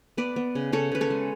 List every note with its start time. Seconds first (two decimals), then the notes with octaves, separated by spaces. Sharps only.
0.17 B3 B4 D5
0.36 B3
0.55 C#3
0.72 C#3 A4 C#5
0.92 C#3 B4
1.01 A4 C#5
1.10 G#3